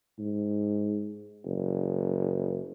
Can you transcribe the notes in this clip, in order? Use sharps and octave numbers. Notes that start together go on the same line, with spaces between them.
G#2
F#1